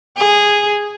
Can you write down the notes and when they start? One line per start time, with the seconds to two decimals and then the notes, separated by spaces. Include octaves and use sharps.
0.17 G#4